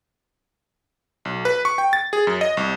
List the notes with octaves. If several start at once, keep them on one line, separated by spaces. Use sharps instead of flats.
B1
B4
C#6
G5
A6
G#4
F#2
D#5
C2